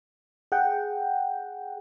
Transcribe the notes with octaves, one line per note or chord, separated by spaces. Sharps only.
G#4 F#5 G5